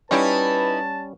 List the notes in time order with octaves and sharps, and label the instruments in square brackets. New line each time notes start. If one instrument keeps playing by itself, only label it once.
[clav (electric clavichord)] G3 C#4 [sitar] D#4 E4 [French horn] B4 [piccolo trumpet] A5